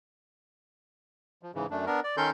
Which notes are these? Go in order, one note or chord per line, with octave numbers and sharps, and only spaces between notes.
F3
G#2 C#3 E3
F#2 A3 D4
B3 D4 A#4
D5
D#3 C#4 A4 A#4 C6 G6